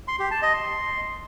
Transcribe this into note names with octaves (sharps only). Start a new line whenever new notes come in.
C6
G4
A5
D#5
C6